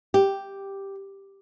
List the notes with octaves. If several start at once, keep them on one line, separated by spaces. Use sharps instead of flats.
G4